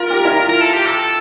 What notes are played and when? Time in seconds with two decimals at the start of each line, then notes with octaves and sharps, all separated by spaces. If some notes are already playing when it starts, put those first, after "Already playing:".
Already playing: F4 A#4
0.10 G4
0.25 E4
0.29 F4
0.49 A#4
0.61 A4
0.73 G4
0.85 A4